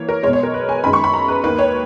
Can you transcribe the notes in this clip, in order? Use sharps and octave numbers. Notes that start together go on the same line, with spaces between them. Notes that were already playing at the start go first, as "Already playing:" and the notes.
Already playing: E3 A#3 C#5
A#4
B1 B2 G#3 C#5
C#5
A#4
B4
G#5
F#2 D#3 G#3 B5
C#6
B5
A#5
B4
D#2 D#3 A#3 B4
C#5